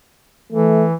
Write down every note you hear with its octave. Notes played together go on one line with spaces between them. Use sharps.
E3 A3